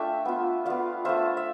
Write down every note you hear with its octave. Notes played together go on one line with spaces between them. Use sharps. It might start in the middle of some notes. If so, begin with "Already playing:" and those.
Already playing: A3 D4 F4 E5 G5
B3 F4
B3 F4 D5 F5
A3 D4 F4 C5 E5
E5